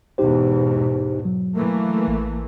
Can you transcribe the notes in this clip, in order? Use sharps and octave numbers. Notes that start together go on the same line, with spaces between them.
E2 G#2 B2 D#4 G4 C5
F#3
E3 A3 A#3
A1